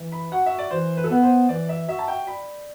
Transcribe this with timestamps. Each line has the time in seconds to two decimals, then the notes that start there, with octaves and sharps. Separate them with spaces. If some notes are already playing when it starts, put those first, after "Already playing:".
Already playing: E3
0.12 B5
0.32 F#4 F#5
0.46 E5
0.59 D5
0.71 E3 C5
0.97 B4
1.04 A4
1.10 B3 B4
1.23 C5
1.49 E3 D5
1.69 E5
1.88 F#4 E5
1.99 A5
2.08 G5
2.27 D5 B5